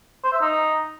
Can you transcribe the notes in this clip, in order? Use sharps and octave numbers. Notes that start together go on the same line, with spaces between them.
C5
E5
D#4